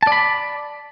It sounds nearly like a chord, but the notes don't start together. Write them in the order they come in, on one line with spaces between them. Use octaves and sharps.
A5 D5 B5